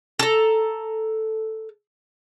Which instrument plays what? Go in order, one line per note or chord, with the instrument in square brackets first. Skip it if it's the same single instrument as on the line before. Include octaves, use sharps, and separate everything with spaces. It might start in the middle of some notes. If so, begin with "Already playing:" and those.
[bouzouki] A4 A#5